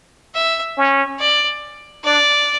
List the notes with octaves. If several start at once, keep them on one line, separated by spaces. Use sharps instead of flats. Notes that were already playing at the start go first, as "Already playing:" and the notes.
E5
C#4
D5
D4 D5